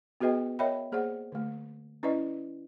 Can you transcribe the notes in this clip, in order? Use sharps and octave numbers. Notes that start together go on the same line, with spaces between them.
B3 F#4 G#4 B4 D#5 G5
A#4 C#5 D#5 E5 G5 B5
A#3 G#4 C5 D5 F#5
D3 A3
C#4 E4 B4 D5 D#5